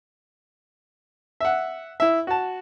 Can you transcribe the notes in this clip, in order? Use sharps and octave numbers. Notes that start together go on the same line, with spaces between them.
E5 F#5
E4 E5
F#4 A5